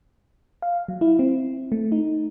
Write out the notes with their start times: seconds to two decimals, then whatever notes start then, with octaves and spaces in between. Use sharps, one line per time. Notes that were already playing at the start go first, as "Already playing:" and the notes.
0.62 F5
0.88 F#3
1.01 E4
1.19 C4
1.72 A3
1.92 D#4